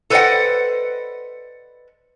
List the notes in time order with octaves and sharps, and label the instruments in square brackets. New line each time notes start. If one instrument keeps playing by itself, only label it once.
[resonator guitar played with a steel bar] A4 B4 C5 D5 D#5 F#5